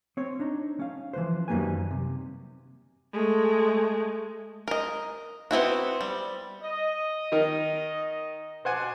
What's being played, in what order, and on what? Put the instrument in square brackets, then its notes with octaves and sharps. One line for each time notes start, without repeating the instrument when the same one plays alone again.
[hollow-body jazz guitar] C4 C#5
D4 D#4
C#4 F5
E3 F3 B4 C5
F#2 D#3 G3 A#3 B4 G#5
C3
[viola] G#3 A3
[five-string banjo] A#4 D#5
B3 C4 E4 F#4
G3
[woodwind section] D#5
[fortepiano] D#3 D#4 A#4
[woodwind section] B2 D4 [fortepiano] C5 F#5 G#5